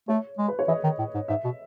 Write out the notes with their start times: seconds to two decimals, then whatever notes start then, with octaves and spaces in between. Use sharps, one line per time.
0.08 A3 C#5
0.38 G#3
0.48 B4
0.59 C#5
0.68 E3 D#5
0.84 D#3
0.99 A2
1.14 G#2
1.28 G#2 E5
1.45 B2